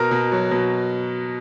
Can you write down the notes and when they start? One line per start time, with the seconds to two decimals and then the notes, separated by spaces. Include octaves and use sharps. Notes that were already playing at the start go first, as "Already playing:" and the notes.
Already playing: B2 A#4
0.11 B2
0.32 F#3
0.51 B2